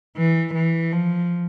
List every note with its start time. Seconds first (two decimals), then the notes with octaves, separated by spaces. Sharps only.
0.17 E3
0.54 E3
0.92 F3